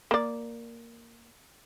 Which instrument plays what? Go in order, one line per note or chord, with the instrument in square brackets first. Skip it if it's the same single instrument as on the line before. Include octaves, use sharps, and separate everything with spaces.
[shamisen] A#3 D5